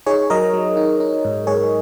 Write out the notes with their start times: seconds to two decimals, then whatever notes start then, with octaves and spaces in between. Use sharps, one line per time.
0.06 D#4 G#4 C#5
0.30 F#3 A#4 D#5
0.54 F#3
0.77 D#4
1.00 D#4
1.25 G#2
1.47 G#2 G#4 C#5